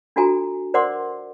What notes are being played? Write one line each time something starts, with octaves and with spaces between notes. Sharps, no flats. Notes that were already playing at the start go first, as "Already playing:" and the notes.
D4 F4 F#4 A4 G#5 A#5
A#4 C5 D5 F#5 C6 D6